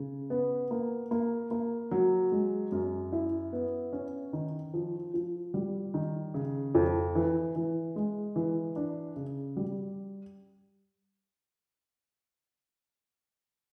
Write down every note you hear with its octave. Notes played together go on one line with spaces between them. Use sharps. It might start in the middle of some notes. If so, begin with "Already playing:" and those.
Already playing: C#3
B3
A#3
A#3
A#3
F#3
G#3
F#2
E4
B3
C#4
D#3
F3
F3
G3
D#3
C#3
F2
E3
E3
G#3
E3
D4
C#3
G3